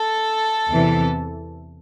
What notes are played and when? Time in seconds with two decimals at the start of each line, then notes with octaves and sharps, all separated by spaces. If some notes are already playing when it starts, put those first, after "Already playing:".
Already playing: A4
0.69 E2 C3 E3